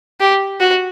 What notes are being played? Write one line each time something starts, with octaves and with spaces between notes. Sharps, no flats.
G4
F#4